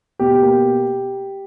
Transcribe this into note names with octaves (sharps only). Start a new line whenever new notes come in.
B2 G4
A#3